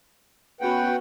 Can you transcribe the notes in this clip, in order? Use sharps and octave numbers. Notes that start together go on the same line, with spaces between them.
B3 C#4 F#4 B4 F#5 G5